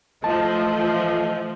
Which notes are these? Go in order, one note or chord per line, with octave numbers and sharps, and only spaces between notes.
E3 F3 A3 D#5 A5